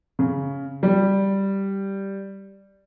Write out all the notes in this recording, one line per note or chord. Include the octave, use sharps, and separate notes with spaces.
C#3
G3